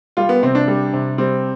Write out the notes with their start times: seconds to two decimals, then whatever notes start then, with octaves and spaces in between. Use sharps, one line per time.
0.17 G3 F4
0.29 B3
0.43 C3 C4
0.55 D4
0.68 G3
0.93 C3
1.18 G3 C4